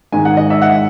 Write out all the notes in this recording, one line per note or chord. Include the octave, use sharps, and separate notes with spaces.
G#2 D#3 G#3 G#5
F#5
D#5
E5
F#5